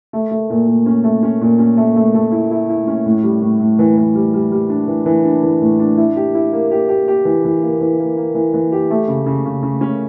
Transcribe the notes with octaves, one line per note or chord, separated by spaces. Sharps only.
A3
A3
A#2
A#2
C#4
A3
C#4
A#2
C#4
A3
A3
A3
E4
E4
E4
C#4
A2
G3
A2
A2
E3
E3
G3
G3
G3
D4
E3
E3
D4
E3
A2
D4
E4
G4
E4
A#3
G4
G4
G4
E3
E3
A#3
E3
A#3
A#3
E3
E3
G4
A3
C#3
C#3
C#3
C#3
C#4